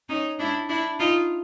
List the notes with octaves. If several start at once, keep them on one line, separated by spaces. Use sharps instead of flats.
C#4 D#4
D4 E4
D4 E4
D#4 F4